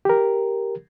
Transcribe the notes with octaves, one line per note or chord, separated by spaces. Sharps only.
G4 A#4